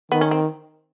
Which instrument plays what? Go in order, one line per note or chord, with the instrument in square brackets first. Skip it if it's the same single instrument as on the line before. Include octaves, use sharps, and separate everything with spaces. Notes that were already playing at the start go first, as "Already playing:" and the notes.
[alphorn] D#3 [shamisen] B3
[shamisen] C#4
C4